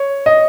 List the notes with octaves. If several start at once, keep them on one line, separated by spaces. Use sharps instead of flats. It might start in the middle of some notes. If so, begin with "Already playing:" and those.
Already playing: C#5
D#5